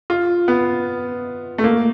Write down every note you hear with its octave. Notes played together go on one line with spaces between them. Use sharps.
F4
B3
A3
A#3